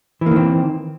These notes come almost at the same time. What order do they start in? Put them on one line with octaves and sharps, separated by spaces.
E3 A#3 D#3 C4